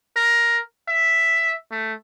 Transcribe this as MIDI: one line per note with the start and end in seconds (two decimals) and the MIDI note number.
0.16 0.60 70
0.88 1.55 76
1.71 1.93 57